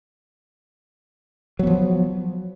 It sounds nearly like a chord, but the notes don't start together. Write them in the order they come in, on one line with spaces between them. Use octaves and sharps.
F#3 B3 F3